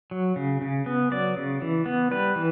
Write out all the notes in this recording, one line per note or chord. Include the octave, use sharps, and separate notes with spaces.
F#3
C#3
C#3
B3
F#3 D5
C#3
E3
B3
G3 B4
E3